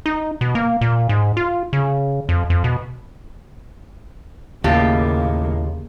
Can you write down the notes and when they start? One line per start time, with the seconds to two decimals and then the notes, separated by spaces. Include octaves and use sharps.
0.06 D#4
0.41 B2
0.55 A#3
0.81 A#2
1.09 G#2
1.37 F4
1.73 C#3
2.29 F2
2.50 F2
2.64 B2
4.64 D#2 A2 C#3 A#3 F4 G4